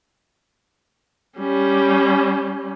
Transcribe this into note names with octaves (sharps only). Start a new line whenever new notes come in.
G3 C#4